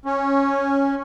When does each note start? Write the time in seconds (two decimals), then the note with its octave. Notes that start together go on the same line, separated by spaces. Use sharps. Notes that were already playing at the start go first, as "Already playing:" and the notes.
0.05 C#4